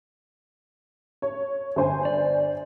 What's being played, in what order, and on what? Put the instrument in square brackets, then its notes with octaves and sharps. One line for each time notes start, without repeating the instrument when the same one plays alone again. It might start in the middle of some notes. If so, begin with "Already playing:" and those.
[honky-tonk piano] C#5
G1 C5 G#5
[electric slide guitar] D5